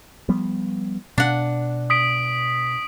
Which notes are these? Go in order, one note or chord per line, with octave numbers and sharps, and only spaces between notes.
F3 G3 B3
B2 D4 F#5
D#6 B6 D7